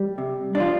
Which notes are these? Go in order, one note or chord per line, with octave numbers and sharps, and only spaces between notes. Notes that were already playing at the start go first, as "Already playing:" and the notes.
Already playing: G3
C3
D4
F3 F4